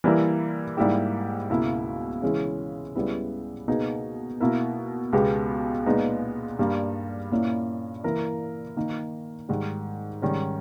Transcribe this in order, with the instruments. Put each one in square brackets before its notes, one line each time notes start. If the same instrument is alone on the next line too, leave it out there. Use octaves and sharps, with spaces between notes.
[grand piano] E3 G3 A#3 E4 A#4
G#2 G3 A#3 E4 G4
C#2 B2 A#3 E4
C#3 E3 G#3 C#4 E4
C#2 C#3 G3 B3 E4
B2 A#3 D#4 G#4 B4
B2 A#3 E4 A#4
C#2 B2 G#3 B3 G4
A#2 G#3 B3 D#4
G2 G3 A#3
A#2 A#3 C#4 E4
E3 A#3 E4 A#4
D#3 A#3 D#4
G#2 D#3 G3
G#2 D#3 G3 C#4